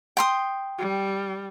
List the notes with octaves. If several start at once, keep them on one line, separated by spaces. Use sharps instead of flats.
G5 C6 D#6
G3